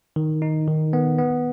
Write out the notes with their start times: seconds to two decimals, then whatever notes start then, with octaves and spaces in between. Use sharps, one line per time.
0.16 D#3
0.42 D#4
0.68 D#3
0.93 B3
1.19 B3